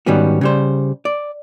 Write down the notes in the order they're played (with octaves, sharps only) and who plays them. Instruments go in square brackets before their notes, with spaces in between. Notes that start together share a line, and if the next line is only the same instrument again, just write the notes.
[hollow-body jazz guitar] G#2 D#3 G3 B3 C#4 F#4
C#3 G3 C5
D5